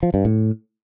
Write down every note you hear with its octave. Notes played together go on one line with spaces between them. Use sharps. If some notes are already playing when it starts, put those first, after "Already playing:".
F3
G2
A2